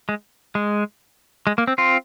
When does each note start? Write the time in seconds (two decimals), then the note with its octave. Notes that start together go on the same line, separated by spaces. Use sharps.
0.09 G#3
0.55 G#3
1.47 G#3
1.58 A#3
1.67 C4
1.78 C4 F4